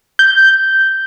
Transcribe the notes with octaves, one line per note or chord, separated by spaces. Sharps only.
G6